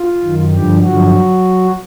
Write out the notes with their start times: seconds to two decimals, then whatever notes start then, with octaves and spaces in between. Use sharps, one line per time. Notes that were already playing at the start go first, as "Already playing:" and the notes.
Already playing: F4
0.23 F#2 D#3
0.53 G2 D3 F3 G3 G4
0.83 G2 D3 F3 F#3 F#4